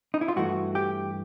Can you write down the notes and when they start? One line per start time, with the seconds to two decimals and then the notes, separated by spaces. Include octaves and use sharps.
0.14 D#4
0.21 E4
0.28 F4
0.36 G2 E3 A3 F#4
0.75 G4